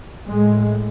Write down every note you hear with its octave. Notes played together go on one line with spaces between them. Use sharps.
A2 G#3